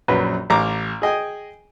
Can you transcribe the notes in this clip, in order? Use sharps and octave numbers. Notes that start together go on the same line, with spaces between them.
A#1 F#2 F#3 B4
A1 A#5 D6
G#4 D#5 G5 G#5